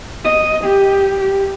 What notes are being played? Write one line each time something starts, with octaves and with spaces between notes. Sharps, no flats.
D#5
G4
G4